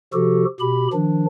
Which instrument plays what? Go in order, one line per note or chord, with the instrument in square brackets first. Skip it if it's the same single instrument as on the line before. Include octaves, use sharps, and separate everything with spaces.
[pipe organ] C3 F3 F#4 G4 A4
B2 G4 B5
D#3 F3 D4